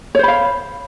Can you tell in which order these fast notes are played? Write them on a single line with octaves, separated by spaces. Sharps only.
C#5 C5 B5 F5